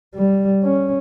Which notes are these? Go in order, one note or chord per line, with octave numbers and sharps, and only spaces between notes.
G3
C#4